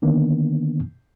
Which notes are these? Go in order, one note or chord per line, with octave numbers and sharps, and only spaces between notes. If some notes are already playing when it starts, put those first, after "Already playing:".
D3 D#3 A#3 B3 D4